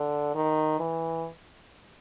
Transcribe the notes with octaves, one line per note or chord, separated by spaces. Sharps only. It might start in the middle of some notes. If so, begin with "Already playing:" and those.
Already playing: D3
D#3
E3